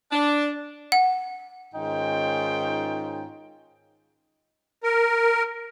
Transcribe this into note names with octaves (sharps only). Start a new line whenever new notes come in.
D4
F#5
G#2 D#3 C#4 D#4 F4 G5
A#4